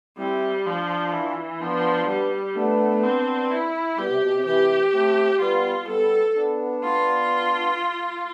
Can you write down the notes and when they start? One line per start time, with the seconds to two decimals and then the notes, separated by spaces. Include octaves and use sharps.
0.18 G3 C4 E4
0.66 F3 D4 F4
1.13 E3
1.61 F3 B3 D4
2.09 G3
2.56 A3 B3 D4
3.03 C4
3.51 E4
3.98 G3 B3 G4
4.10 C3
4.22 B2
4.34 C3
4.45 C3 E3 G4
4.93 A3 C4
5.40 G3 B3 F4
5.88 G3 B3 A4
6.35 B3 D4
6.83 F4